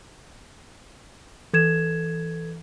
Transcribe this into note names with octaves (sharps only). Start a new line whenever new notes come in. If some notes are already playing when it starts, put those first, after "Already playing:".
E3 A4 G#6 E7